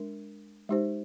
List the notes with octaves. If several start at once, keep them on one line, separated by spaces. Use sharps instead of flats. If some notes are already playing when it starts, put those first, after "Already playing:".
Already playing: G#3 D4 A#4
G#3 D#4 G4 C5